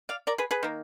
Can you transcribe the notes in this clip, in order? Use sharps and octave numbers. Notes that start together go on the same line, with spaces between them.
D5 F5
A#4 D5
G#4 B4
G#4 B4
D#3 A#3